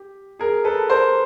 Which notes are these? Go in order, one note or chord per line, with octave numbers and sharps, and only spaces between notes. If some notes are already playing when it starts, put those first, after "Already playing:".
Already playing: G4
G#4 A#4
A4 B4
A#4 C5